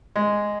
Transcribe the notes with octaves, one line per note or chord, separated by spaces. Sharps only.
G#3